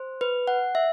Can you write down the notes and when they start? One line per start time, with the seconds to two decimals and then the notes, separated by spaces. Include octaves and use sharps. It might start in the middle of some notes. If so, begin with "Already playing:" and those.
Already playing: C5
0.21 B4
0.48 F#5
0.75 E5